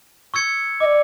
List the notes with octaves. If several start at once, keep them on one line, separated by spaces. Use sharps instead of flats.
C#6 E6 G#6 C#7
D5 D#5 D6